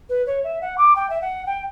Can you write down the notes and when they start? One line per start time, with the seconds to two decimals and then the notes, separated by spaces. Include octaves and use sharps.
0.09 B4
0.26 C#5
0.43 E5
0.61 F#5
0.77 D6
0.95 G5
1.09 E5
1.21 F#5
1.46 G5